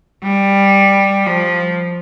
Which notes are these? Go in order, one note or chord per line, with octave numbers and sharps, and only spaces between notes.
G3
F3